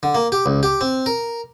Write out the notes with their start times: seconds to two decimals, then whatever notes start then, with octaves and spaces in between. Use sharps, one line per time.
0.03 D3
0.15 A#3
0.32 G4
0.46 C#2
0.63 G4
0.81 C4
1.06 A#4